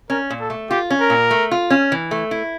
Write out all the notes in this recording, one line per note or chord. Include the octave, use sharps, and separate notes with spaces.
C#4 A#4
A#2
A4
A3
F4 G4
C#4
A#4
A#2
A3
F4
C#4
E3
A3
E4